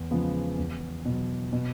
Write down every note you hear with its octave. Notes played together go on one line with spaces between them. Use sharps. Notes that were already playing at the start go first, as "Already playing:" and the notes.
Already playing: E2
C#3 F3 G#3 B3
E2
B2 F#3
B2